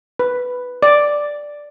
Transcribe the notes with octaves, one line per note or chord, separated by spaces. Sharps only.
B4
D5